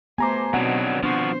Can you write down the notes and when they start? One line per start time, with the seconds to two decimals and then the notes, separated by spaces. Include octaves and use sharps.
0.18 A3 B3 G4 C5 G#5 A#5 D6
0.54 B2 F#3 C4 D4 D#4 F#5
1.03 F3 B3 D4 F#4 C5